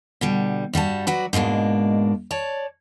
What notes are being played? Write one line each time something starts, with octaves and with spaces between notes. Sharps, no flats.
B2 D3 G3
G2 G3 F#4 A5
F#3 F#4 B4 D5
G#2 B2 G#3 A#3 D4
C#5 D5 A5